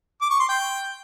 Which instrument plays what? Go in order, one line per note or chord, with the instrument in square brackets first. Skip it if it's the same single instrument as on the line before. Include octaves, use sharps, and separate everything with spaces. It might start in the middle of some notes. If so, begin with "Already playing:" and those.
[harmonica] D6
C#6
C6
G5